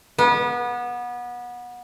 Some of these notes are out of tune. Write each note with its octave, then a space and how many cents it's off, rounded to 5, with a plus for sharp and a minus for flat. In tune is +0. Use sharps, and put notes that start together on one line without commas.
B3 -25